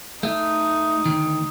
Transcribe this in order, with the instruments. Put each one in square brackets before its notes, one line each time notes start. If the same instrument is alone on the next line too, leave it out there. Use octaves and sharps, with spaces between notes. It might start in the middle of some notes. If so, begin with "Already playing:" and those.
[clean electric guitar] A3 [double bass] D#4
[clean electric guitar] D2 G#2 D#3